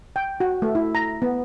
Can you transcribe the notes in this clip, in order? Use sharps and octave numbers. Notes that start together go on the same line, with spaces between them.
G5
F#4
A3
E4
A#5
B3